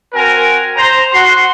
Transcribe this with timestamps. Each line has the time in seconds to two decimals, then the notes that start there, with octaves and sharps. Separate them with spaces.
0.14 C4 F#4 A#4 G#5
0.77 C5 A#5
1.13 F#4 C6